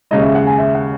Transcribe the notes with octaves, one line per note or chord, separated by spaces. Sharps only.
D#2 C#3 G#3 D#5
E5
F#5
G#5
E5
F#5